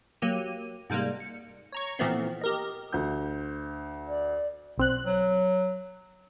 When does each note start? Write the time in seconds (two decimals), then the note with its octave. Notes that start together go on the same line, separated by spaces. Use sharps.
0.22 F#3 A#3 G4 D#7
0.90 G#2 C3 G3 G#3 A#3
1.20 C#7
1.72 C#5 A#5 C#6
1.99 A#2 E3 F3 A3 B3 C4
2.41 G4 A#4 D#5
2.92 D2 G6
4.08 D5
4.77 B1 C4 F#6
5.05 F#3